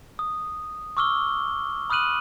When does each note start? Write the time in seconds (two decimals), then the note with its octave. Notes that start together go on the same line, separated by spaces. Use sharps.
0.19 D#6
0.97 C#6 D6 E6 F6 G7
1.90 B5 D#6 F6 F#6 D#7 F#7